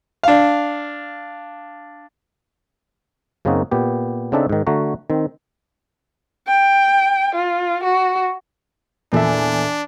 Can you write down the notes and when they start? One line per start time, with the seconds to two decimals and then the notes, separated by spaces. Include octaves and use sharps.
0.23 D4 F5
3.45 F#2 C#3 A#3 C4 D#4 F#4
3.71 A#2 B3 G4
4.32 C#3 C4 D4 D#4 A4 E5
4.49 G#2 D#3
4.67 D3 A3 F#4 A#5
5.10 D#3 C4
6.48 G5
7.35 F4
7.83 F#4
9.13 E2 A#2 D4 A4 E5